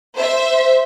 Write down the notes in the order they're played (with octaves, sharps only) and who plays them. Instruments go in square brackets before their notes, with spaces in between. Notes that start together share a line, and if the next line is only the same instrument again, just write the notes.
[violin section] C5 E5